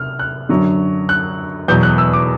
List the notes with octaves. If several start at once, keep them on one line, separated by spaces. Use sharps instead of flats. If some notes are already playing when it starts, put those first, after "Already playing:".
Already playing: C3 F6
F#6
F#2 D3 F#3
F#6
E2 B2 F#3 G6
F#6
E6
D6